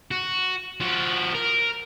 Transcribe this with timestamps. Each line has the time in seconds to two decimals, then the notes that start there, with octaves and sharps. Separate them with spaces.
0.11 F#4
0.80 F3 F#4
1.34 A#4